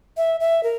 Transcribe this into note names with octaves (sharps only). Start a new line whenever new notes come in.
E5
E5
A#4